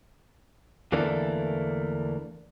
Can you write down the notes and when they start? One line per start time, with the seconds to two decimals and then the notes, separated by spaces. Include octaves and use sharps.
0.92 E2 D3 E3 A3 A#3 D4